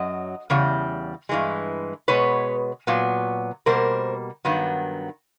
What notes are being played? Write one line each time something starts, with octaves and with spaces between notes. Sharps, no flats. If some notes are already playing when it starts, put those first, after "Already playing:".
Already playing: F#2 F#3 D#5
E2 C#3 G3
G2 E3 G#3
B2 G#3 B3 B4 C#5
A#2 F#3 B3
B2 G3 A#3 A#4 C5
G2 D#3 F#3 B3